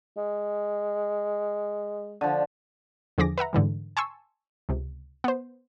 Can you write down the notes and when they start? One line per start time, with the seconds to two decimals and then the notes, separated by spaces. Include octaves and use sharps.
0.17 G#3
2.21 D3 F3
3.18 E2 D3 F3 G#4 D6 A#6
3.38 B4 E5 F#5 A#5
3.53 G#2 D3 E3 G3
3.97 G#5 A5 C6 C#6 E6
4.69 C#2 C3
5.24 B3 C5